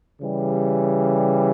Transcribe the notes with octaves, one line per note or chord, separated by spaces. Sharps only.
C#3 E3 G3